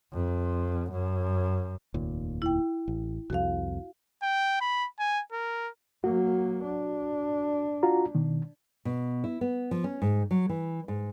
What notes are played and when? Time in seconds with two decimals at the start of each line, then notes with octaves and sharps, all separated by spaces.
0.13 F2
0.91 F#2
1.94 F1 D#2 A#2
2.42 E4 G5
2.88 A1
3.30 C2 F2 F#4 F5
4.22 G5
4.61 B5
4.99 G#5
5.32 A#4
6.04 F#3 A#3 F#4
6.64 D4
7.83 F4 F#4 A#5
8.15 B2 D#3
8.85 B2
9.24 E4
9.41 B3
9.71 F3
9.84 C#4
10.02 G#2
10.31 F#3
10.49 E3
10.88 G#2